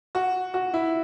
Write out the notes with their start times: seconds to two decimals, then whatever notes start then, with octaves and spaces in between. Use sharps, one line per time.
0.15 F#4
0.54 F#4
0.74 E4